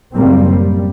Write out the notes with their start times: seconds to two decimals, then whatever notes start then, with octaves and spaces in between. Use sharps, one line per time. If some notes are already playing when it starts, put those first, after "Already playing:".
0.15 F#1 A2 C#3 G3 A#3 C4
0.50 G3